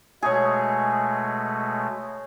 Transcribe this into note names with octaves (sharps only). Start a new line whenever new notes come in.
B2 G#3 A3 G#4 C#5